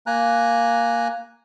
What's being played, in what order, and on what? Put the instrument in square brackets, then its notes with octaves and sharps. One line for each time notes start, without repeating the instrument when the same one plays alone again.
[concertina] A#3 G#5 A#5 F#6